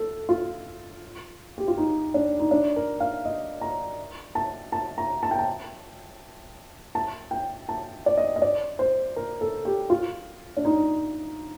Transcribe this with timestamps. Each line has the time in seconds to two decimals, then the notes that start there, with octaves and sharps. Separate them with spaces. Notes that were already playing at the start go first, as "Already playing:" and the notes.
Already playing: A4
0.29 F4
1.58 G4
1.68 F4
1.77 D#4
2.14 D4
2.39 D#4
2.51 D4
2.76 A#4
3.00 F5
3.25 D#5
3.61 A#5
4.35 A5
4.72 A5
4.98 A#5
5.23 A5
5.31 G5
5.39 A5
6.95 A5
7.31 G5
7.69 A5
8.06 D5
8.18 D#5
8.36 D#5
8.42 D5
8.79 C5
9.16 A#4
9.41 A4
9.65 G4
9.90 F4
10.57 D4
10.65 D#4